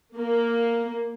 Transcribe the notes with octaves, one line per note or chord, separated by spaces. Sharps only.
A#3